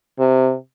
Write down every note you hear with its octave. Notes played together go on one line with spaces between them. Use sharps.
C3